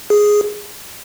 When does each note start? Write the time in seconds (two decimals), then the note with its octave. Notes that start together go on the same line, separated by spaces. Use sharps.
0.10 G#4